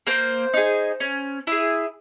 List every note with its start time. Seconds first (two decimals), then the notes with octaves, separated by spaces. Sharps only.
0.07 A#3 C5
0.54 D#4 G#4
1.00 C#4
1.47 E4 G#4